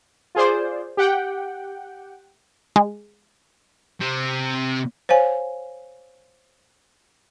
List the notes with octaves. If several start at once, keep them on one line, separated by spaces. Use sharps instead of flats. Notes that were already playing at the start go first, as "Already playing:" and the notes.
F4 G#4 C5 D5
G4 F#5 G5
G#3
C3 C4
C5 C#5 F5 G#5